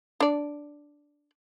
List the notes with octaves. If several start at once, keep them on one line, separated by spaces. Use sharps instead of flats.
D4 D5